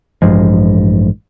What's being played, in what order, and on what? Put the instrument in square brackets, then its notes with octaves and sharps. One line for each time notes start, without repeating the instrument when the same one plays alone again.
[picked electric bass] A1 G2 F3 G#3